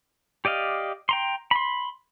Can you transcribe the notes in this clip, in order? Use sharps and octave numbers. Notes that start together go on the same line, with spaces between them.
G4 D5 D#5 F5
G5 A#5 C6
B5 C6